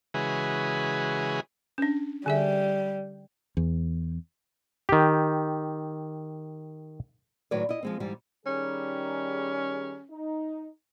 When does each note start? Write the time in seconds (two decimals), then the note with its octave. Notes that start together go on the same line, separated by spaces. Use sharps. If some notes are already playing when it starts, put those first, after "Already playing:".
0.14 C#3 E3 G#3 F#4 G#4 B4
1.78 C#4 D4
2.26 D3 G3 G#4 E5
3.57 E2
4.89 D#3 G4
7.51 A2 D#3 F#3 B4 C#5 D5
7.69 E4 D#5
7.83 F3 G#3 C4
8.00 G#2 E3 G3
8.46 D#3 G3 C#4 G#4
10.10 D#4